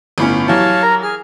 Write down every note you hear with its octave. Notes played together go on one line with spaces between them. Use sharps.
G1 A2 C#4
E3 F#3 G3 C#5 F5 A5
A#4 A#5
G#4 F6